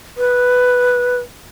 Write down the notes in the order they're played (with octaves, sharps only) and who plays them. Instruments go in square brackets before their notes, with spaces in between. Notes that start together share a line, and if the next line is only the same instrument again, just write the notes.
[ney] B4